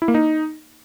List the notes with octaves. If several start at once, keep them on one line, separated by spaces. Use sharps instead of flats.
E4
A#3
D#4